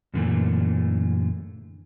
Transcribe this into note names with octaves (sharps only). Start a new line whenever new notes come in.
F#2 A#2 D3 E3 A3 A#3